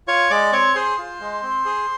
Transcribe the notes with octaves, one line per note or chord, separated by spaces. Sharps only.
F4 C#5 C#6
G#3 D5 D6
C4 C#5 C#6
G#4 C5 C6
F4
G#3
C4
G#4